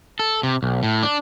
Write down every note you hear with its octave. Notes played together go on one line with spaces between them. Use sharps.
A4
C3
B1
A2
D4